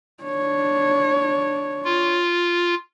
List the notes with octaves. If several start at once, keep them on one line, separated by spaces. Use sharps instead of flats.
D4 C#5
F4